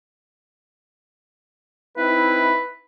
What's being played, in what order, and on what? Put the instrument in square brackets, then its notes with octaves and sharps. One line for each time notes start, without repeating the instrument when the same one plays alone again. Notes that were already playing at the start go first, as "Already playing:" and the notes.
[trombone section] C4 D#4 E4 [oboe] B4